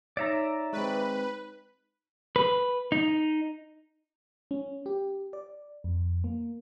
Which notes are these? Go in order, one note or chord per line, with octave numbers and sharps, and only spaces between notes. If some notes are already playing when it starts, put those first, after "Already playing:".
D#4 C#5 D5 E5 A#5
G#3 C4 B4 C#6 F#6
B4
D#4
C#4
G4
D5
F2
A#3